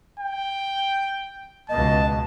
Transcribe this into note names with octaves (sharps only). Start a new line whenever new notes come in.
G5
C#2 B2 D#5 A5